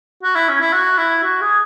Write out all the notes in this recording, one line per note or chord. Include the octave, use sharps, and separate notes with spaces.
F#4
E4
C#4
E4
F#4
E4
F#4
G#4